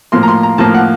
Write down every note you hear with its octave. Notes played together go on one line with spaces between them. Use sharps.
A2 F3 A#3 C6
A#5
C6
A#5
A2 F3 A#3 A5
F#5